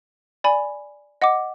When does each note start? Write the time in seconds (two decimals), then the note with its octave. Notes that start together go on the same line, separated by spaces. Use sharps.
0.44 D5 G#5 B5
1.22 D#5 F#5 D6